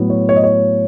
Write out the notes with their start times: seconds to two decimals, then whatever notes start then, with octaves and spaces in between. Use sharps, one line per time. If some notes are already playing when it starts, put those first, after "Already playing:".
Already playing: A2 F#3 B3
0.10 C#5
0.29 C#5
0.36 D#5
0.44 C#5